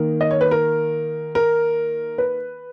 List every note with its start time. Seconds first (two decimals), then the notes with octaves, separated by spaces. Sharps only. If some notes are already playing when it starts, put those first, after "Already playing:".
Already playing: D#3 A#3 A#4
0.21 D#5
0.31 C#5
0.41 B4
0.51 A#4
1.35 A#4
2.18 B4